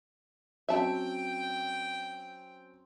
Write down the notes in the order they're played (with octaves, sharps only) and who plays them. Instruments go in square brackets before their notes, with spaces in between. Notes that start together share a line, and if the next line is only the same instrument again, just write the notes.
[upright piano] F#3 C4 C#4 [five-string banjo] E5 A5 [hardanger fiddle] G5